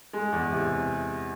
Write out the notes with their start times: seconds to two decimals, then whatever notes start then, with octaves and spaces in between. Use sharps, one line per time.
0.13 G#3
0.32 E2
0.52 C3